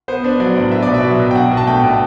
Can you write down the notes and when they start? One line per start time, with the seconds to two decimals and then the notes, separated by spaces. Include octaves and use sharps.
0.08 B3 C5
0.24 D4
0.40 F#3 D5
0.56 A2
0.71 B3 E5
0.82 D5
0.88 B2
0.94 E5
1.04 F#3
1.20 B2
1.31 G5
1.35 D4 F#5
1.51 B2
1.57 A5
1.67 A3 G5
1.83 B2